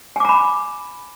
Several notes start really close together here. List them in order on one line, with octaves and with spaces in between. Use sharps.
G#5 D6 A#5 B5